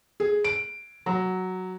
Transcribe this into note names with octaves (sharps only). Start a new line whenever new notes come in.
G#4
D7
F#3